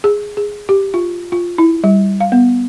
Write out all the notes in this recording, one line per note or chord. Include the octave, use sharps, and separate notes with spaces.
G#4
G#4
G4
F4
F4
E4
G3
F5
B3